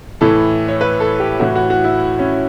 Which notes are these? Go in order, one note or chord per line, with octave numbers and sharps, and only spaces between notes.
A2 E3 A4
C#5
B4
A4
G4
A2 E3 F#4
F#4
F#4
E4
C#4